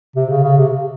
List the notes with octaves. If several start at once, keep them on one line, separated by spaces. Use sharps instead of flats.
C3
C#3
C#3
C3